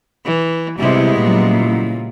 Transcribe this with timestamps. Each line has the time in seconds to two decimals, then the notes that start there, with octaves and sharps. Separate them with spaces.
0.25 E3
0.79 C3 G3 G#3 B3 E4
1.20 A#2 C#3 F#3 E4